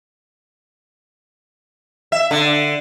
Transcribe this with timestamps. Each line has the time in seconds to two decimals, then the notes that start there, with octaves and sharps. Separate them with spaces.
2.12 E5
2.31 D3